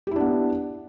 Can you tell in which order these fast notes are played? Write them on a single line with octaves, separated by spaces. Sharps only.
G4 E4 D4 B3